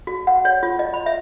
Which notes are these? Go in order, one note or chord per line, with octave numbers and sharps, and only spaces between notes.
F#4
F#5
C#5
F4
D#5
B5
E5